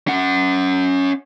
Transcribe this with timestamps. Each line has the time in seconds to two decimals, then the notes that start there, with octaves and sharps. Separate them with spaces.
0.08 C#4 F#5